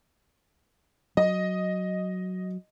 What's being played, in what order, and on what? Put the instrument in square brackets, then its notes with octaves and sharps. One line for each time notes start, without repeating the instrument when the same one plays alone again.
[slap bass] F#3 [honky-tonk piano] D#5